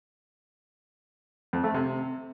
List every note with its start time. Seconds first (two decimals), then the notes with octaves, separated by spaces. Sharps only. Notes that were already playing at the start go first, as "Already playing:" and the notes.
1.53 F2
1.64 A3
1.74 C3